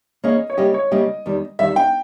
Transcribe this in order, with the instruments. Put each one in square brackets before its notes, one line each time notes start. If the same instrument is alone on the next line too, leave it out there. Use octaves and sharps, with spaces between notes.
[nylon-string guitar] E3 A#3 C#4 G#4 C#5 [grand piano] D#5
[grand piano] C#5
[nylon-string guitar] C#3 G3 A#3 C#4 G4 [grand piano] D#5
[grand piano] C#5
[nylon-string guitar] C#3 G3 A#3 C#4 G4 [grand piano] D#5
[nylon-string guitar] E2 D#3 G3
[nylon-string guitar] E2 D#3 G3 [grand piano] E5
[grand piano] G5